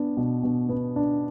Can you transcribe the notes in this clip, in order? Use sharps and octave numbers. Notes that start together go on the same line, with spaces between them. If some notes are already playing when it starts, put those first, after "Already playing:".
Already playing: B3 D4
B2
B2
B3
D4